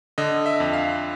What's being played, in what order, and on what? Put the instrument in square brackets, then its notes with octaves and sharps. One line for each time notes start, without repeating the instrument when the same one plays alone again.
[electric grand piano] D3 D#5
E5
F2
F5